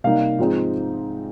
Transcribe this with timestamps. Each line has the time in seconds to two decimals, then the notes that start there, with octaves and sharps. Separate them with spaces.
0.04 C3 G3 A#3 D#4 F5
0.38 G#2 F3 G#3 C4 D#4